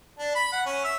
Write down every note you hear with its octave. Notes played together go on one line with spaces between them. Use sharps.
D4
B5
F#5
C#4
E5